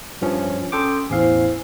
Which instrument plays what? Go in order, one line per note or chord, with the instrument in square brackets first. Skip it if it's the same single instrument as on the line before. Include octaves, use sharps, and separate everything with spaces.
[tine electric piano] G2 F3 C#4
[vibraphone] C#4 C6 D#6 [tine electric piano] A4 G5 D6
[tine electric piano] A1 E2 F5 [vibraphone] E4 C5 G#5